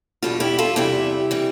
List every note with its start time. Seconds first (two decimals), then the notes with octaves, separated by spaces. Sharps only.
0.22 E2 B2 G3 F4 A4
0.40 E4 G4
0.59 F4 A4
0.76 E2 C3 G3 E4 G4
1.31 C3 E3 G3